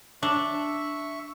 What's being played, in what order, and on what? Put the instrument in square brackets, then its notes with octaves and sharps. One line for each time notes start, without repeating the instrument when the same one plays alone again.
[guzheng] D4 [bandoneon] E5 C#6